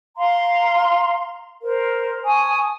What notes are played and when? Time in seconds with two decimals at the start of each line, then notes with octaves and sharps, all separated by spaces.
0.17 F5 A#5 C6
1.63 A#4 C5
2.25 G#5 A5 C#6 D#6